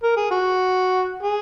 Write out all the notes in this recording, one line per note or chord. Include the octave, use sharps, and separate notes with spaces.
A#4
G#4
F#4
G#4